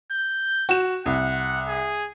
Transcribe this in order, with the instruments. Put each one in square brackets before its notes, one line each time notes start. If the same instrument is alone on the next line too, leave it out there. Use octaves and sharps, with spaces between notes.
[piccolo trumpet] G6
[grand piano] F#4 E7
[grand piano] C2 [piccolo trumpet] F#5
[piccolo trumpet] G#4